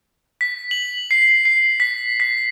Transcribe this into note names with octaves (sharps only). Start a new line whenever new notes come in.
B6
F#7
C7
C7
B6
B6